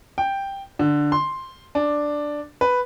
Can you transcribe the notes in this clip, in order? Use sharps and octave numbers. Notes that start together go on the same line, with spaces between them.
G5
D3
C6
D4
B4